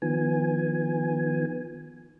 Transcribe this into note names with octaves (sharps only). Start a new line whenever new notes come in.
D#3 F3 B3 G#5